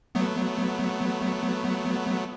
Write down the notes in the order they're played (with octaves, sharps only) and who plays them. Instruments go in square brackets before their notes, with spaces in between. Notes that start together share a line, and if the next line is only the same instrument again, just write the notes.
[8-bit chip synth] F#3 A3 B3